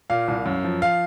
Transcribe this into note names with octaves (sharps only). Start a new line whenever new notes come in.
A#2 F5
C2
F#2
F3
F5